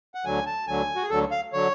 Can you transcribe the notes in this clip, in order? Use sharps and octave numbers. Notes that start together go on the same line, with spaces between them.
F#5
D2 D3 F#3 G#5
A5
D2 D3 F#3 G#5
F#4
G#4
D2 D3 F#3 A4
F5
D3 F#3 C#5